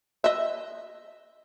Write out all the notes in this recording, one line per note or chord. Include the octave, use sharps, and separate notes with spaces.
D#5 E5